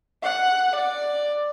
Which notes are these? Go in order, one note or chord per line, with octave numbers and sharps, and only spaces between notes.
F#5
D5